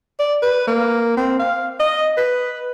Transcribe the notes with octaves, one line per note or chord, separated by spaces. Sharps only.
D5
B4
A#3
C4
F5
D#5
B4